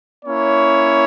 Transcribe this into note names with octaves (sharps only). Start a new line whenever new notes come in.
A#3 C#4 E4 C#5